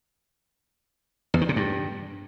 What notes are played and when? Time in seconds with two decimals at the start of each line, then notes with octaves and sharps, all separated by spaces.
1.34 E2
1.41 D#3
1.49 C3
1.56 G2